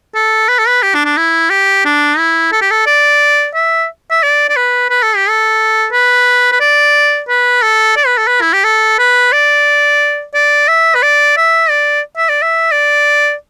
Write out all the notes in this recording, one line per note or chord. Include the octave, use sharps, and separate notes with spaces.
A4
B4
A4
B4
G4
D4
D4
E4
G4
D4
E4
A4
G4
A4
D5
E5
E5
D5
D5
B4
B4
A4
G4
A4
B4
B4
D5
B4
A4
D5
B4
A4
B4
E4
G4
A4
B4
D5
D5
E5
B4
D5
E5
D5
E5
D5
E5
D5